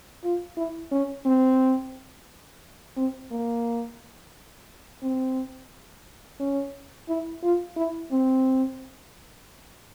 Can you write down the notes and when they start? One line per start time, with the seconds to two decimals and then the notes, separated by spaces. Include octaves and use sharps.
0.24 F4
0.57 E4
0.92 C#4
1.25 C4
2.97 C4
3.31 A#3
5.03 C4
6.40 C#4
7.09 E4
7.43 F4
7.77 E4
8.12 C4